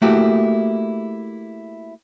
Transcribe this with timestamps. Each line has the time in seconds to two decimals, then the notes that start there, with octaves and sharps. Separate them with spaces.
0.02 A3 A#3 E4 F#4 G4